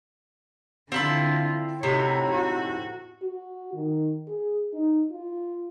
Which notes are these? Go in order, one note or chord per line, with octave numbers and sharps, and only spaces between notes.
D3 C4 E4 F4 A5
A2 C3 D#4 F#4 C#5
F#4
F#4
D#3
G#4
D#4
F4